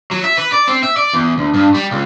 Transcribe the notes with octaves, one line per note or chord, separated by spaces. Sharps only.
F#3
E5
B4
D5
C4
E5
D5
E2
D2
G2
G3
C#2